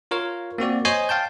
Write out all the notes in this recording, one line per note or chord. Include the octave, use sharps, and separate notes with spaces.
F4 A#4 C#5 F5
A#3 C4 F#4 D5
C5 C#5 D#5 G#5 C6
F5 G5 A5 G6